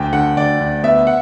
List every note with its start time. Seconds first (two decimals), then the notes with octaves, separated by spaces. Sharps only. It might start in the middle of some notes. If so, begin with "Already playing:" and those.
Already playing: D2 G5
0.13 D3 F#5
0.36 D2 D5
0.61 D2
0.83 B3 E5
1.07 F#5